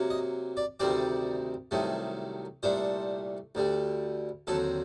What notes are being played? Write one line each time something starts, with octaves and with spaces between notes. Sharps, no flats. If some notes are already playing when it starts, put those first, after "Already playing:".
Already playing: C3 F#3 A#3
D#5
D5
D2 C3 D#3 G3 C4 D5
C2 C3 D#3 F#3 A3
C2 A#2 A3 D4 C5
D2 D3 G3
D#2 D3 F#3 C4 A4